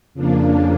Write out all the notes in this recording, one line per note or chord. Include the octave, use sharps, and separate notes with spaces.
F2 C#3 F3 A#3 D4